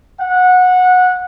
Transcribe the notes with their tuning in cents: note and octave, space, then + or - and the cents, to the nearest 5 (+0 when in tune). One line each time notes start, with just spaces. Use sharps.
F#5 -20